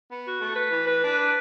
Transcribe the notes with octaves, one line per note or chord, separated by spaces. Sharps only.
B3
F#4
A3
B4
E3
B4
D4
B4